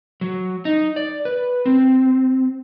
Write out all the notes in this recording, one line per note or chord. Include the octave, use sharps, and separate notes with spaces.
F#3
D#4
D5
B4
C4